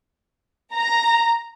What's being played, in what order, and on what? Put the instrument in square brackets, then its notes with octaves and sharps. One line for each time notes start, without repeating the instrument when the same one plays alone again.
[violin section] A#5